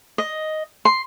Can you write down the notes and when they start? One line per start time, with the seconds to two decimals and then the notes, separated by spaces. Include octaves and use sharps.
0.18 D#5
0.85 C6